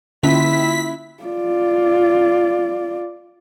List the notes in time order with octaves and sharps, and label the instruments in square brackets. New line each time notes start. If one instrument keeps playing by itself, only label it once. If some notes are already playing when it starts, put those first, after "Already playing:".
[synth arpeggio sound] D3 [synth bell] A#3 C#4 F4 [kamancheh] E4 [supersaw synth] B6
[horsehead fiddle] F4 D5